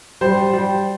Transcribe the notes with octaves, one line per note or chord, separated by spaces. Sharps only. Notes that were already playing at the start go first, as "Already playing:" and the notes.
G3 C5
G3